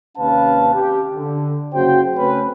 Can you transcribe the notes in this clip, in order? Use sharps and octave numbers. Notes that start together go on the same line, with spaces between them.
D#2 C3 C#4 B4 F5 A5
G4
D3
F#1 C#3 F#4 C5 G5
C#3 A3 C4 C#4 B4